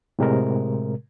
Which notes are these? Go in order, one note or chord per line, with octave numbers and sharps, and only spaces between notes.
A2 C3 G#3 A#4